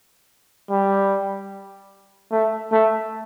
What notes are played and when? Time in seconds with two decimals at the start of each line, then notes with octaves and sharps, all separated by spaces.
0.71 G3
2.32 A3
2.72 A3